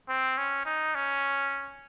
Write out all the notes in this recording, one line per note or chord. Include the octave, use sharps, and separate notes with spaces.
C4
C#4
D#4
C#4